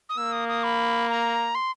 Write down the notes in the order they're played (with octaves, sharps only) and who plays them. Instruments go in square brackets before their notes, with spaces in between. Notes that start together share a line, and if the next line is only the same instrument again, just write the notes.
[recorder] D#6
[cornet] A#3 [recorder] E6
[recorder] D#6
D#6
B5
A#5
C6